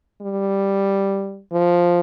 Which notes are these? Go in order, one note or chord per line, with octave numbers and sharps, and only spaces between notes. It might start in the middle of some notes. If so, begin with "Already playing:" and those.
G3
F3